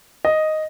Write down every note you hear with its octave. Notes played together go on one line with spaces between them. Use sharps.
D#5